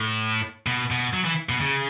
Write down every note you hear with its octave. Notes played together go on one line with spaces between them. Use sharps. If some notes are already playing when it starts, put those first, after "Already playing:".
Already playing: A2
B2
B2
F#3
E3
B2
C#3